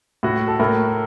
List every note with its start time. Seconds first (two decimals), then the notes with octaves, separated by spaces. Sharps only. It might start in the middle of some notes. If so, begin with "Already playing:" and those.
0.23 A2 F#4
0.48 A4
0.60 A2 A#4